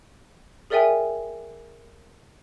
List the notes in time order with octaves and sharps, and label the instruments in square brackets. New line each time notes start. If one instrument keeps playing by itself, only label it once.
[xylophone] G#4 A#4 D5 E5 G5 G#5